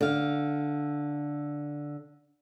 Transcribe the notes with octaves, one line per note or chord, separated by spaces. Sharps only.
D3 F5